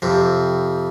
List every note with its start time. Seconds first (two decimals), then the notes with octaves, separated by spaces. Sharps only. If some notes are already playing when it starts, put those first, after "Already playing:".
0.02 F2 C3